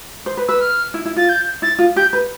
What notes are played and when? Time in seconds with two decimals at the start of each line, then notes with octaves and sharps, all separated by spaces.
0.26 C5
0.37 B4
0.48 B4 E6
0.61 F6
0.94 E4
1.05 E4
1.16 F4 A6
1.29 G6
1.62 E4 A6
1.79 F4
1.96 G4 G6
2.13 B4